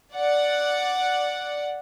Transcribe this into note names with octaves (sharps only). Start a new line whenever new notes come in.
D5 F#5